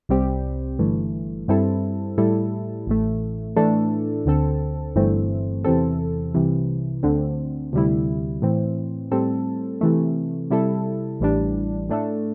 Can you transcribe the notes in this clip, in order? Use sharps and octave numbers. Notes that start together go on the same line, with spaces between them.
C2 C3 G3 C4 G4
G1 G2 E3 A3
G2 G3 C4 E4 A4
A2 G3 E4 A4
A1 A2 A3
A2 E3 A3 D4 A4
D2 D3 C4 A4
G1 G2 E3 A3 C4
E2 C3 E3 C4 A4
C2 C3 E3
D2 D3 C4
D2 C3 G3 E4
A2 E3 C4
A2 G3 C4 A4
C3 E3 A3
C3 G3 E4 A4
A1 A2 E3 G3 D4
A2 A3 D4 A4